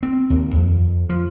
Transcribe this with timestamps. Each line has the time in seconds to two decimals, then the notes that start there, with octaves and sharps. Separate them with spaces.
0.03 C4
0.30 D#2
0.55 F2
1.09 F3